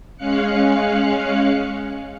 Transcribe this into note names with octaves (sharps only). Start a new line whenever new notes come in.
G#3 C#4 F5 F#6 C#7